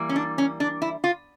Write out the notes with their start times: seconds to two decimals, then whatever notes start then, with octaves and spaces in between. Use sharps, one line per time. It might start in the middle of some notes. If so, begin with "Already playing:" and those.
Already playing: E3 G3 A#3
0.09 C#4
0.16 D4
0.38 C#4
0.60 D4
0.82 E4
1.04 F4